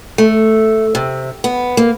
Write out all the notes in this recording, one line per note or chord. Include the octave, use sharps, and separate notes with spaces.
A3
C3
B3
A#3